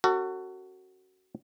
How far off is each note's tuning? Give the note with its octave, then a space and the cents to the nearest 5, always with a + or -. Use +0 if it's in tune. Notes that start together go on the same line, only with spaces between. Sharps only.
C#4 -40 F#4 +15 A4 +40